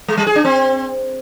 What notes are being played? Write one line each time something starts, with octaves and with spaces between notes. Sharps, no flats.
G#3
G3
G#4
D4
C4